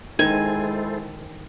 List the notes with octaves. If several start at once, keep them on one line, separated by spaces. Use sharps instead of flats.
D#3 G#3 E4 A4 C5 G#5